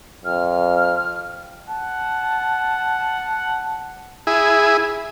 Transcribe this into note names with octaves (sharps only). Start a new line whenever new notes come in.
F2 F6
F#5 A5
E4 G#4